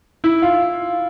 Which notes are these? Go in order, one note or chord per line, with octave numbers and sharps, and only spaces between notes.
E4
F4